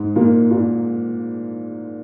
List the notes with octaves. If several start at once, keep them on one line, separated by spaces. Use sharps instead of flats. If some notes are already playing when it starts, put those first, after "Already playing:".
Already playing: G#2 G#3
A#2 A#3
A#2 A#3